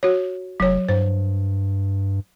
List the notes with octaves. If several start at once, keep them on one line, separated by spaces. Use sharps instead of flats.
F#4 C#5
F1 F#3 C#5
G2 C5